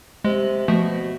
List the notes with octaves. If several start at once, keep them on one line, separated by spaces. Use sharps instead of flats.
C3 G#3
B2 F3 A3